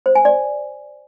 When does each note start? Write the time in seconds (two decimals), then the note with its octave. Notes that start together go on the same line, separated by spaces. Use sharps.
0.06 C5
0.15 G#5
0.25 D5